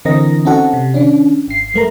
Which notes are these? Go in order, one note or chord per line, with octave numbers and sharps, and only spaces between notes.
D3 E3 C4 A#4 D#5 A#6
C4 C#4 D#4 F#4 A4 F#5
C3
D#3 C#4 D4
G#1 C7
F#2 A3 A#4 A#5